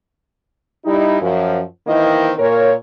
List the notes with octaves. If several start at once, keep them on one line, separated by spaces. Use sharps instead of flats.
G3 D#4 E4
F#2 F3
D#3 E3 A#3 C4 E4 D#5
A#2 A#4 C#5